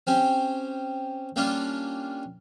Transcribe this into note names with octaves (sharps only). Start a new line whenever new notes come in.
C4 C#4 G4
G3 A#3 C#4 D4 F4